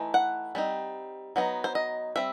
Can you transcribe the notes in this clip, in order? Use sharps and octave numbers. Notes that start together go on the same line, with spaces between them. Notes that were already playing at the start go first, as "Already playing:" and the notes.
Already playing: E3 A3 D#4
F#5
G3 C4 D#4
F#3 B3 D#4
C5
D#5
G3 C4 E5